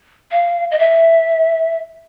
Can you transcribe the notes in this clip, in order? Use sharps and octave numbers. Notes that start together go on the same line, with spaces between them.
F5
D#5
E5